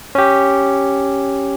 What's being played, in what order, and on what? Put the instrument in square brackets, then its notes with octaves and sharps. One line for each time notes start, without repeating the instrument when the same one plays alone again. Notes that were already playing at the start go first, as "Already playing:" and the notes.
[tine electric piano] C#4 G4